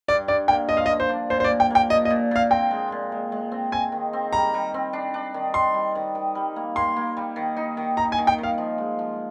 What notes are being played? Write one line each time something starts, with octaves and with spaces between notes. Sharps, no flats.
G2 D5
G2 D5
A#3 G5
F3 D#5
F5
D#5
A#3
C5
D4
A#2 C5
C5
D5
A#2
G5
A#3 G5
A#2 D#5
D#5
A#2
A#2 F5
C4 G5
G#3
A#2
G#3
G#3
C4
C4 G#5
D#3
C4
G3 A#5
G3
C4
D4
D4
D#3
D#3 C6
G3
D#3
D#3
G3
A#3
A#3 C6
A#3
G3
D#3
D#4
D#3
D#4 A#5
G#5
D#3
G5
D#3
F5
F3
G#3
F3